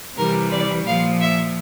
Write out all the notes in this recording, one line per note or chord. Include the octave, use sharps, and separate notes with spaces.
C3 E3 G3 A#4
D5
A#2 F3 F5
E5